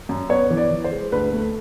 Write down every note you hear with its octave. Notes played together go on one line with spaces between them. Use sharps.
F#2
B3 C#5
E3
D5
E3
C5
G#3
D2 B4
A3